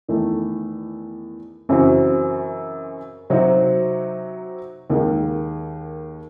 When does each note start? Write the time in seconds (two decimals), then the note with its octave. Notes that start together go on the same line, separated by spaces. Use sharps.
0.08 E2 D#3 A3
1.69 F#2 C#3 E3 C4 F#4
3.30 C3 F#3 C4 D#4 F#4
4.90 D#2 D#3 G#3